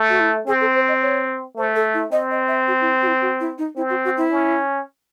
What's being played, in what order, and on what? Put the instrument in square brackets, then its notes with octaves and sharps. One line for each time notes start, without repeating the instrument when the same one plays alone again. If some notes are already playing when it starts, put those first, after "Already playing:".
Already playing: [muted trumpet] A3
[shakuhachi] F#4
E4
[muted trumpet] C4 [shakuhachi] G#4
[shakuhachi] A4
C5
D#5
C#5
[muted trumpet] A3 [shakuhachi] C5
[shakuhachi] A4
E4
[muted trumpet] C4 [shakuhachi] D#5
[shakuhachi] D#5
E5
F#4
E4
F#4
E4
F#4
E4
D#4
[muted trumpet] C4 [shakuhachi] E4
[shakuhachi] F#4
F#4
E4
[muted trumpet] C#4